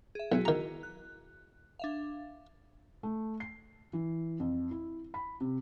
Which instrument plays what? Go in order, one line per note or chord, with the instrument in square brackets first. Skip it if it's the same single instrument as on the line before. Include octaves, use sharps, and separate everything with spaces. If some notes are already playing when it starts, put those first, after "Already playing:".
[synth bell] G#4 E5
[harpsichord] B1 [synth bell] E4 F#4 G#4
[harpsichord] D#3 A#5
[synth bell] F#6
D4 E5 F5
[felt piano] A3
C7
E3
F2
E4
B5
C3